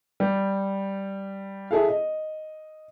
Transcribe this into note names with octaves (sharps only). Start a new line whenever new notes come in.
G3
E4 G#4 A4 F5
D#5